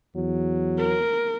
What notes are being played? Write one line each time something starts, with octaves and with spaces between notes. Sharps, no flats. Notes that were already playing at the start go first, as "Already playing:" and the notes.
E2 F#3
A#4